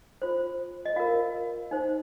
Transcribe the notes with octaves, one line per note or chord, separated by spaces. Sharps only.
F4 C5
D#5
F4 A#4 F5
D#4 C5